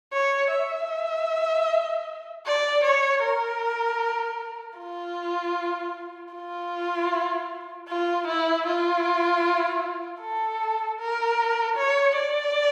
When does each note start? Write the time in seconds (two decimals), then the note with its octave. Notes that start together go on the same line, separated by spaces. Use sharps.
0.13 C#5
0.52 E5
2.46 D5
2.84 C#5
3.23 A#4
4.79 F4
6.34 F4
7.89 F4
8.28 E4
8.67 F4
10.21 A4
10.99 A#4
11.77 C#5
12.16 D5